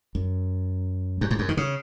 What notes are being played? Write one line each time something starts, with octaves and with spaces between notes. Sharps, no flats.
F#2
F#2
G#2
F#2
D#3
C#3